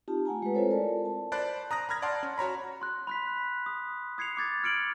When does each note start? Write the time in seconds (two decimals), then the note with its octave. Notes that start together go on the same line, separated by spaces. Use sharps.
0.08 C4 D#4 F4 G4 A5
0.26 A3 F#5 G#5 A#5
0.42 G#3 B4
0.55 C4 E4 F4 A4 C5 C#5
0.70 A#4 D5 A5
1.05 A5
1.32 C5 D5 A5 B5 F#6
1.71 A#5 D#6 F#6 A#6
1.89 A#5 B5 F6 G#6 A#6
2.02 D5 F#5 A5 C6
2.23 C#4
2.38 F#4 C#5 A#5 B5
2.82 C6 F#6
3.07 B5 F#6 B6
3.66 D#6
4.18 D#6 G#6 C7 C#7 F7
4.37 D6 G#6 A6
4.64 F6 C#7 D7 F#7